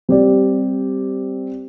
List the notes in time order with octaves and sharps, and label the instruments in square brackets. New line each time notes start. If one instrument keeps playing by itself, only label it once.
[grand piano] G3 C4 G4 D5